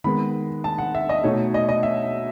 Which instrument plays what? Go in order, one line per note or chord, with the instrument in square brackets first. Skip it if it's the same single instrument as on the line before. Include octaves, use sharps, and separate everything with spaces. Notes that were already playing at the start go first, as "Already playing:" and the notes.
[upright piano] D#3 G#3 B3 B5
A5
F#5
E5
D#5
B2 A3 D#4 C#5
D#5
D#5
E5